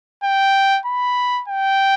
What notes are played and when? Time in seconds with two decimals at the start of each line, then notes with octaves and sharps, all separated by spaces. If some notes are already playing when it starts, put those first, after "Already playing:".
0.24 G5
0.86 B5
1.48 G5